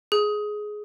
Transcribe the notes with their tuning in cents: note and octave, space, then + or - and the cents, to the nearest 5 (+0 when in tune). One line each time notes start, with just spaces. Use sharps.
G#4 +15